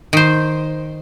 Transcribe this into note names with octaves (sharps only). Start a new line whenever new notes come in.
D#3 C5